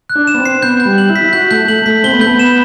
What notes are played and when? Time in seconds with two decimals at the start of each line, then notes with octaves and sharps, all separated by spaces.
0.10 F#6
0.16 D4
0.27 E7
0.34 B3
0.38 C4
0.45 C7
0.62 B3 G6
0.80 G6
0.86 G3
0.98 F#7
1.10 E4
1.16 B6
1.24 E4
1.33 F#4 G6
1.51 A3 G6
1.68 A3 F#7
1.86 A3 B6
2.04 C4 G7
2.12 B3
2.19 A3 G6
2.27 B3
2.39 E7